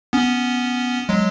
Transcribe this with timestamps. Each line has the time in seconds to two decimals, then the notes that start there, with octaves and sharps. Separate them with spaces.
0.13 B3 C#4
1.09 F#3 G#3